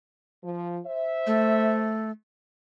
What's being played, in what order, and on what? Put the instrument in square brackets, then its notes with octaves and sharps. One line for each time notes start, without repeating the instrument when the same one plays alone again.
[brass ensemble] F3
C5 E5
[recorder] A3